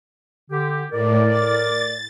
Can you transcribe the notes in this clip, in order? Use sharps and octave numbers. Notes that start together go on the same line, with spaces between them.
D3 G4
A2 A#4 D5
A6